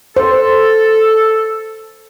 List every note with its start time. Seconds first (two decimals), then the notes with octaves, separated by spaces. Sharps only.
0.17 A4 C5